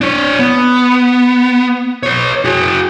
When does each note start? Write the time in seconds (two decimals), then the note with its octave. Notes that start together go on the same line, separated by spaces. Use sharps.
0.01 D4 C#5
0.39 B3
2.03 B4 C#5
2.45 F#4 G#4